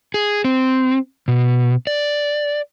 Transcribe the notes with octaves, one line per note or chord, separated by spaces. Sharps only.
G#4
C4
B2
D5